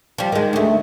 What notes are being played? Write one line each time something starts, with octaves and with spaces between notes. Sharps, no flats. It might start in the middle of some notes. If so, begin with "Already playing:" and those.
F3 G3
D#3 G#3
D2 A3